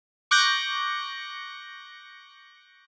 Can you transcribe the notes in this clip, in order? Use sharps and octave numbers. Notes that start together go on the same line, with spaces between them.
C#6 D6 F#6 G6 A#6 C#7